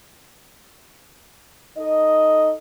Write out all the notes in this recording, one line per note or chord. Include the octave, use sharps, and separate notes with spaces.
D#4 A4 D#5